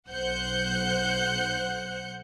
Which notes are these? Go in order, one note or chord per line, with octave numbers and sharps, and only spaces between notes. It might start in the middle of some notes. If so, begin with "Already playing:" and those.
B1 C5 F#5 F#6 G6 C#7